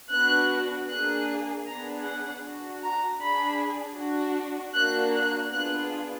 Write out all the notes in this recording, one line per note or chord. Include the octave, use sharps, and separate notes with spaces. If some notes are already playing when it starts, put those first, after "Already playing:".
B3 D4 F#4 F#6
A#3 D4 G#4 F#6
B3 D4 G#4 A#5
F#5
D4 F#4
A#5
D4 G#4 B5
D4 F#4
A#3 D4 F#4 F#6
F#6
B3 D4 F4 G#4 F#6